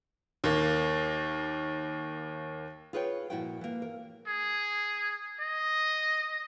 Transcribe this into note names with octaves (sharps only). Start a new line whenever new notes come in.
D#2 A#3
F4 G#4 B4 C#5 D#5 G5
A#2 F3 E4 F#4 A#4 G5
E3 A#3
A#4
G#4
D#5